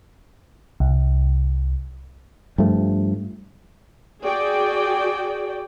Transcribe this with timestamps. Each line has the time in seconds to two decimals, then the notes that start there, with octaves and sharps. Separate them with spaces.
0.80 C2
2.58 G2 F3 A3
4.23 F#4 G#4 D5 G5